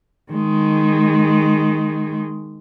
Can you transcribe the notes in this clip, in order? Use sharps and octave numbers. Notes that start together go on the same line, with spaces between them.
D#3 G#3